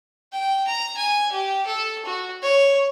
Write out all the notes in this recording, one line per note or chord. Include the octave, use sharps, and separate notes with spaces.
G5
A#5
G#5
G4
A4
F#4
C#5